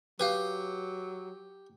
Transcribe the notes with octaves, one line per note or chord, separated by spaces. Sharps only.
F#3 G4 B4 F5 D#6